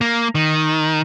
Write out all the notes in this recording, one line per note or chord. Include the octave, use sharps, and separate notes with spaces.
A#3
D#3